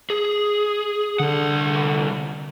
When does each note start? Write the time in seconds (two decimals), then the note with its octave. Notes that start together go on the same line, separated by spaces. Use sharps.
0.10 G#4
1.20 C2 D3 F#5